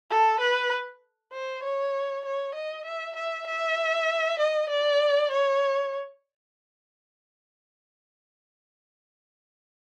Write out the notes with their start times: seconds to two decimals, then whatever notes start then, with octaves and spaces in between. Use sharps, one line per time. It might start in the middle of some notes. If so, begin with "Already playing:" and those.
0.10 A4
0.40 B4
1.32 C5
1.63 C#5
2.25 C#5
2.55 D#5
2.85 E5
3.16 E5
3.47 E5
4.39 D#5
4.69 D5
5.31 C#5